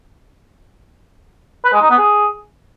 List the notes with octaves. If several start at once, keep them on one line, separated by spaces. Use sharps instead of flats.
B4
G#3
D#4
B3
G#4